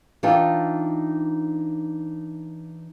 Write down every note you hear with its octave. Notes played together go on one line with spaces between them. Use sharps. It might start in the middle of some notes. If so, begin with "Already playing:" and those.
E3 D4 D#4 F4 D5 G5